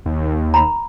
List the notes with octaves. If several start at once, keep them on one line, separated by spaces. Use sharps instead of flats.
D#2
A#5 B5